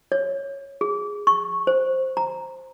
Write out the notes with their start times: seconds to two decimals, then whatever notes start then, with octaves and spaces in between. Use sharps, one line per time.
0.12 C#5
0.81 G#4
1.27 C#6
1.67 C5
2.17 A#5